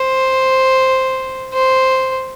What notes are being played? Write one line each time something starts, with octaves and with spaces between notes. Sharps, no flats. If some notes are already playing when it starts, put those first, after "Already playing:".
Already playing: C5
C5